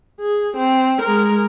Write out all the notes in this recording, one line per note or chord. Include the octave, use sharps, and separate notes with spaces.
G#4
C4
G#3 A#4